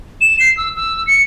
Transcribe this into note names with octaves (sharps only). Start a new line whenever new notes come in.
E7
C7
E6
E6
C#7